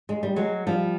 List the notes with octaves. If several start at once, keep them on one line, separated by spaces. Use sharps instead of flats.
G#3
G3
F#3 G#3
F3 G3